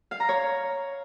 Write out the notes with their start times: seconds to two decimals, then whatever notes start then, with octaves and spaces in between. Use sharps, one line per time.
0.11 F5
0.20 A#5
0.29 C#5